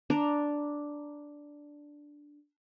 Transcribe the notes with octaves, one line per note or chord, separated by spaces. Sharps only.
D4 D5 A#5